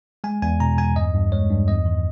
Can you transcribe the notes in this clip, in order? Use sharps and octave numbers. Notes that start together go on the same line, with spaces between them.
G#3 G#5
E2 G#5
B2 A#5
E2 G#5
G2 D#5
G2
G#3 C#5
G2
E2 D#5
D#3